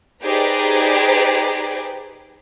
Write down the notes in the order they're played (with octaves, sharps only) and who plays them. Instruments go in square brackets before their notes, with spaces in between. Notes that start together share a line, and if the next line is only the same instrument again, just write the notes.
[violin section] D#4 G4 G#4 B4 C5 D5